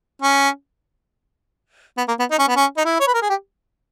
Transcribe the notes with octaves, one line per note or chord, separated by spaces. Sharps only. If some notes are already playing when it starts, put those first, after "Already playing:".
C#4
B3
A#3
B3
D#4
C#4
B3
C#4
D#4
E4
C#5
B4
A#4
G#4
G4